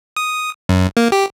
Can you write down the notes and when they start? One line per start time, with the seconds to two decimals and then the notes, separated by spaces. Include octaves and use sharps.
0.16 D#6
0.69 F#2
0.97 A#3
1.12 G4